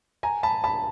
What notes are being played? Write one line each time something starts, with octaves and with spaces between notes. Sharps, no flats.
G#5 A#5
A5 B5
A5 B5